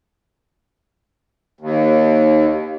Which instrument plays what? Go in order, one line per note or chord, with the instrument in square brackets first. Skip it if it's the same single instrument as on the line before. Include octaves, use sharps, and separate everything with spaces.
[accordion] D#2